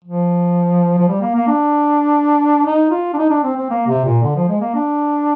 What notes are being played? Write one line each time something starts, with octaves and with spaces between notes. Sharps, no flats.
F3
F3
G3
A#3
A#3
D4
D#4
F4
D4
D#4
D4
C4
C4
A#3
C3
A#2
D3
F3
G#3
A#3
D4